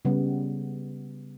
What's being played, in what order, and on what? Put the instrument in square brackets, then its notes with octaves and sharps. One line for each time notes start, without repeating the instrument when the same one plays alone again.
[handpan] C#3 G3 B3